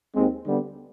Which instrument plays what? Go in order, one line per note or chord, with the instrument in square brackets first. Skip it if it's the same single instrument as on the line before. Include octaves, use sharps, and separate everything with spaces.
[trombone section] D#2 D#3 G#3 C4
D3 G3 B3